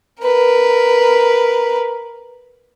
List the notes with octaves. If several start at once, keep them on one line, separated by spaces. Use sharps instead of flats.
A#4 B4